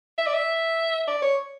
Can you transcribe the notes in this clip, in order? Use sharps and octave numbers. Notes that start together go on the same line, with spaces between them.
E5
D5
E5
D5
C#5